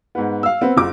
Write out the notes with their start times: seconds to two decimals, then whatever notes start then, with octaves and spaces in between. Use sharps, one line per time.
0.15 G#2 B3
0.43 F5 E6
0.61 B3 C4
0.77 F#1 F4 D6